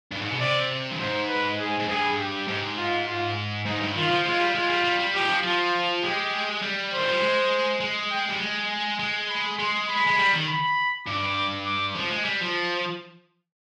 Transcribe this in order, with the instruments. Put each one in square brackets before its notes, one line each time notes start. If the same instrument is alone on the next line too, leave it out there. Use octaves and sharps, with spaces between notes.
[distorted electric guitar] G2
G#2
B2
[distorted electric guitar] C3 [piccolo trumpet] D5
[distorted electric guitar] G2
[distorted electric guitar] G#2 [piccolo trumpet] C5
[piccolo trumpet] B4
G#4
[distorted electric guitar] G#2
[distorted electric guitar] G2 [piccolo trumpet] G#4
[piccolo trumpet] G4
[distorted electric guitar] G#2
[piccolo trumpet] F4
F4
[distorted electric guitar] G#2 [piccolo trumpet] D#4
[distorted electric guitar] G2
[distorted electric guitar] D#3 [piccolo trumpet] F4
[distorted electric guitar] F3
[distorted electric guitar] G#3 [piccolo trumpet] F4
[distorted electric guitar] G3
[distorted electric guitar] G#3 [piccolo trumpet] F4
[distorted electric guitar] G3
G3
G3
[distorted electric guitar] F3 [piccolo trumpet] G4
[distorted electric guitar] D#3
F3
[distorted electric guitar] F3 [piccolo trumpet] F4
[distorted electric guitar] G#3 [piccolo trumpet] G4
[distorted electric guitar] G3
[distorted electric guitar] D#3 [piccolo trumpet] C5
[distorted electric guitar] F3
G3
G#3
G#3
[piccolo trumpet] G5
[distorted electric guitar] G3
G#3
G#3
[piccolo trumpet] B5
[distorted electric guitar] G#3 [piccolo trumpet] C6
[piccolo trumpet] B5
[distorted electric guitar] G#3
G3
D#3
[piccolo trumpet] B5
[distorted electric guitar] G2 [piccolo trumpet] D6
[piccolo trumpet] D6
[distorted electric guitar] F3
G#3
G3
F3